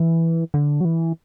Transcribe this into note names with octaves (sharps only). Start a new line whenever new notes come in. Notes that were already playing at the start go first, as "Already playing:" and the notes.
Already playing: E3
D3
F#3
E3